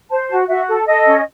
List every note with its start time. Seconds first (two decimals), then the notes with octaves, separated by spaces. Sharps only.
0.10 C5 A5
0.29 F#4 A5
0.48 F#4 E5
0.68 A4
0.86 A4 D#5
1.06 C#4